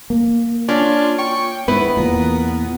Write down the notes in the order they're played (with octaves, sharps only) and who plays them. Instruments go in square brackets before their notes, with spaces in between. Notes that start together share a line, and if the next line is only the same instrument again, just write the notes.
[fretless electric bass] A#3
[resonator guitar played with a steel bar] C#4 [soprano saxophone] D4 [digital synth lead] F4
[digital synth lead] G5 [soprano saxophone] C#6
[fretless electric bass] G#2 [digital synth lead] B3 [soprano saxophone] E4 [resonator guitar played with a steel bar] B4
[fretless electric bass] E2 A#2 [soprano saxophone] A#4